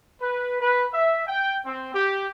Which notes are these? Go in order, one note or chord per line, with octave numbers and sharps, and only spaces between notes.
B4
B4
E5
G5
C4
G4